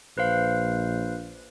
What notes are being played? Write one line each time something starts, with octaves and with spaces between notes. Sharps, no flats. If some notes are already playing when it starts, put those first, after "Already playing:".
A#1 B4 C5 F5